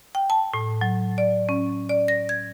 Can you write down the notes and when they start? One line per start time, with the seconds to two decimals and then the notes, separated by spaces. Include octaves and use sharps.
0.15 G5
0.30 A5
0.54 A2
0.81 F#3
1.18 D5
1.49 C#4
1.89 D5
2.08 A#6
2.29 G#6